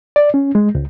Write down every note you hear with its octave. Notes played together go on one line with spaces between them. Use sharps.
D5
C#4
G#3
C#2